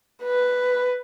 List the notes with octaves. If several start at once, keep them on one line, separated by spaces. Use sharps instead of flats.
B4